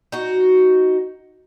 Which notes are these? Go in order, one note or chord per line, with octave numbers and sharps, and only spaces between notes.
D#4 F#4